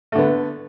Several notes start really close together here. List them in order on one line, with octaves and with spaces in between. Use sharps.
A3 D3 B3